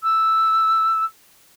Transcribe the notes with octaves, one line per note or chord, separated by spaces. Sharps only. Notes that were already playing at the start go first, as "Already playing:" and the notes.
E6